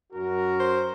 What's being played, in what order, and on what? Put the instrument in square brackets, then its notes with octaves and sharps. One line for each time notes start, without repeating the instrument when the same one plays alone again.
[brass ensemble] F#2 F#4 A#4
[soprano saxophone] C5